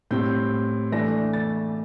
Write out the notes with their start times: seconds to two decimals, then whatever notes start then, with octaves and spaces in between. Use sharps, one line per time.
0.11 A2 G3 C4 G6
0.92 E3 A3 D4 A#6
1.33 A6